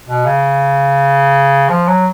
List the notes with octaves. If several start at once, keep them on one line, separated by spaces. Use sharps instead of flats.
B2
C#3
F3
F#3